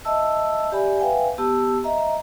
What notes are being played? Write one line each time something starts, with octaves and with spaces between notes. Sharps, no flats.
D#5 E5 A5 E6
G4 D5 E5 G#5 B5
B4 E5 F5 G5 G#5
B3 G4 A5 E6
D#5 E5 A#5